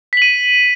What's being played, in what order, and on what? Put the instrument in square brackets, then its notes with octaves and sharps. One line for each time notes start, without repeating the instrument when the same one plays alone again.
[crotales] B6
F#7
D#7